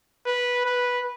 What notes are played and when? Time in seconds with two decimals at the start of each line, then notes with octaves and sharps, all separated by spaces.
0.26 B4
0.66 B4